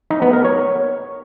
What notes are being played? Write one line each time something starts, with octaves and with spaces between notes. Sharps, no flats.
D#4
B3
A#4
C#5